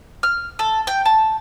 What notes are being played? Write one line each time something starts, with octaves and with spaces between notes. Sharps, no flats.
F6
A4
G5
A5